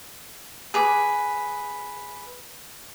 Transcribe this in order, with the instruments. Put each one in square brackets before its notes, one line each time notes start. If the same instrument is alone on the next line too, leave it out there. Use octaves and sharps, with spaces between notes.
[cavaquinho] G#4 B4 D6